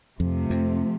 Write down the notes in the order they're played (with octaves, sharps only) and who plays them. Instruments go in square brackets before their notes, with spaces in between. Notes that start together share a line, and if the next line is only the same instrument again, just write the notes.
[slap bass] F2 [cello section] C3 F3 A3
[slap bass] F2